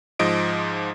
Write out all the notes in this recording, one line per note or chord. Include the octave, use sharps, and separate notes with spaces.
G#2 F3 D#5 D7